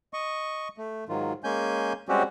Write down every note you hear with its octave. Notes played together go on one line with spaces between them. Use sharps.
D#5 C#6
A3
G#2 D#3 F#3 F4
G#3 A#3 C#4 G#5 G6
G3 G#3 C4 C#4 F#4 G4